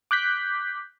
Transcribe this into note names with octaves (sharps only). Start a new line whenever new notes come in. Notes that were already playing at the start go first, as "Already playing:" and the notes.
D6 F#6 G6 B6